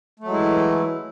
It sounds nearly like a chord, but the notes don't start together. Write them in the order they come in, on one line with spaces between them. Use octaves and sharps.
A3 F#3 G#3 E4 E3